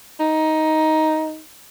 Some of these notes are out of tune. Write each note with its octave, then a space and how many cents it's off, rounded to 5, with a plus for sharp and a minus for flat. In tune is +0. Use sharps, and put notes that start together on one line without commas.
D#4 +10